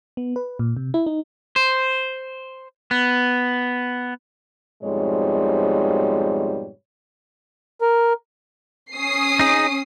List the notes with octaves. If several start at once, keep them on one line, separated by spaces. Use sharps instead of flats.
B3
B4
A#2
C3
E4
D#4
C5
B3
F2 G#2 B2 G3 G#3 C#5
A#4
C#4 D#6 C7
D#4 G#4